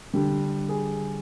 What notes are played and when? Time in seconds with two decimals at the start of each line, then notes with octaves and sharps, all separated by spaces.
0.14 D3 G3 G4
0.69 G#4